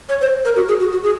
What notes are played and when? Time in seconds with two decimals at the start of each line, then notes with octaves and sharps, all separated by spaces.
0.09 C#5
0.21 C5
0.45 A#4
0.56 F#4
0.68 G#4
0.80 F#4
0.92 F#4
1.03 G#4